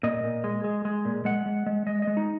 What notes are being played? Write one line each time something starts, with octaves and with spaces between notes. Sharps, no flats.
A#2 D#5
A#2
G#3
G#3
G#3
A#2
G#3 F#5
G#3
G#3
G#3 D#5
D#5
G#3
D#4